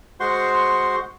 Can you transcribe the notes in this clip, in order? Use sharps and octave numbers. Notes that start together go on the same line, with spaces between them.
G#3 F#4 C5 F#5 C6 C#6